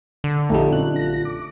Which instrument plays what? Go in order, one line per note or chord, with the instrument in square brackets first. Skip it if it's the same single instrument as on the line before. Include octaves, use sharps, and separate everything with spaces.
[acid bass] D3
[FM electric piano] A#1 F2 G3 [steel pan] A3 D#4
[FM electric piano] A#1 F#2 F#6 [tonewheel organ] C4 D4 F4
[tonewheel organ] F4 A#6
D6